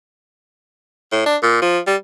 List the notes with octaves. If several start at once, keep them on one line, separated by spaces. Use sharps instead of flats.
A2
D4
A#2
F3
G3